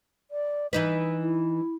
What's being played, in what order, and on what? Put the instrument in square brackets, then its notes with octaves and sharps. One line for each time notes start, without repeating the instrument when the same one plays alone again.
[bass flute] D5
[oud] E3 D#4 B4 [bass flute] D#5
[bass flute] E4